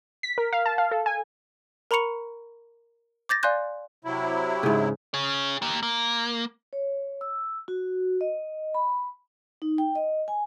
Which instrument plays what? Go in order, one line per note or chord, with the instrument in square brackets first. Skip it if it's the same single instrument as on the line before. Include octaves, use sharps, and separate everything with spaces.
[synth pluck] B6
A#4
F5
A5
F5
A4
G#5
[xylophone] A#4 A#5 B5 C#6 C#7 F7
D6 G6 A6 A#6
D5 F5 G#5 C6 F#6 G6
[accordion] C3 F#3 E4
[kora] G#2 C#3
[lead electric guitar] G#4 C#5
A#3 G4
A#3
[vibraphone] C#5
E6
F#4
D#5
B5
D#4
G5
D#5
G#5